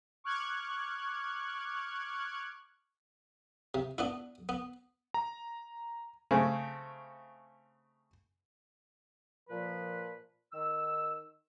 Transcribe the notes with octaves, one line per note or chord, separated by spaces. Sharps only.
C#6 D6 F6 F#6 G#6
C3
B3 D4 E4
B3
A#5
C#3 A3 C4
A#2 F3 B4
D#3 E6